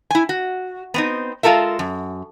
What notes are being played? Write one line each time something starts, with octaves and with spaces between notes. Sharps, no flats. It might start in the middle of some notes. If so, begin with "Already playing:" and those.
E4 G#5
F#4
B3 C4 D#4
G#3 F4 A4 A#4 E5
F#2